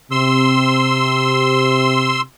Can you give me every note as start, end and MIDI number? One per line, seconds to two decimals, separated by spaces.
0.11 2.21 48
0.11 2.21 84
0.11 2.21 88